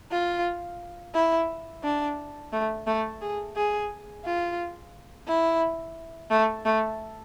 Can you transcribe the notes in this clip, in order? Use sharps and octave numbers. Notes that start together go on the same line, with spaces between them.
F4
E4
D4
A3
A3
G#4
G#4
F4
E4
A3
A3